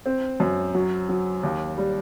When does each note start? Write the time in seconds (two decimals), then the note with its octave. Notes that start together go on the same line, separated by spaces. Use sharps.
0.06 C4
0.40 F#2
0.75 F#3
1.09 F#3
1.43 D#2
1.78 G3